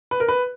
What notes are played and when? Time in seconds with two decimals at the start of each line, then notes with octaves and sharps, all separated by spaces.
0.11 B4
0.20 A#4
0.28 B4